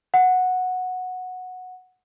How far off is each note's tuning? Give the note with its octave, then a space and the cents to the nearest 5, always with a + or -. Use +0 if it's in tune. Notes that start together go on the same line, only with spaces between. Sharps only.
F#5 -10